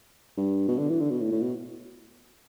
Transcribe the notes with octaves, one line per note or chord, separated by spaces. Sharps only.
G2
B2
D3
E3
D3
B2
A2
A2
B2